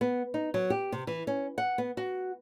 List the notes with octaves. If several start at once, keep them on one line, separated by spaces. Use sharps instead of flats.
B3
D#4
F#3
G4
C3
E3
C#4
F#5
B3
F#4